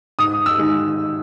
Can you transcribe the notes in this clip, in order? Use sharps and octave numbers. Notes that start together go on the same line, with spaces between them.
G#2 D#6
E6
D#3 G#3